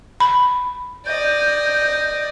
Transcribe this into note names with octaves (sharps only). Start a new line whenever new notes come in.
B5
D5 D#5 G6